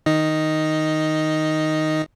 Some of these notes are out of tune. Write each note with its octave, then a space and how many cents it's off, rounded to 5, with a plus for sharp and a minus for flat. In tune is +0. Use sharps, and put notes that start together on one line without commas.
D#3 +0 D#4 +0 D#5 +0